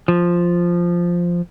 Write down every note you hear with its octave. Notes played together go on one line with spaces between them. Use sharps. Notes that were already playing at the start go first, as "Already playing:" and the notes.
F3